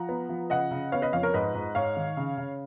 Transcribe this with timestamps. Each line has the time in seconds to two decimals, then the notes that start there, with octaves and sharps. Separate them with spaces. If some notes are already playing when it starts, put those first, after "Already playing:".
Already playing: F3 F#5 A#5
0.09 B3
0.29 F3
0.50 C#3 D#5 F#5
0.71 C#3
0.92 B3 C#5 F5
1.02 B4 D#5
1.13 F2 C#5 F5
1.23 A#4 C#5
1.34 G#2 B4 D#5
1.55 G#2
1.75 G#2 C#5 F5
1.97 D#3
2.17 C#3
2.38 C#3